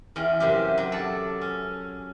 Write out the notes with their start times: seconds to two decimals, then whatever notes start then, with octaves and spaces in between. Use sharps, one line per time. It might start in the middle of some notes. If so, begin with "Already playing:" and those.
0.16 E2 C#4 G5
0.40 F#2 C3 G4
0.78 F#3
0.92 A4 D5
1.41 C#4